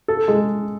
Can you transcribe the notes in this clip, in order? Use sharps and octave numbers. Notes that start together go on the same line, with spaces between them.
A4
G#3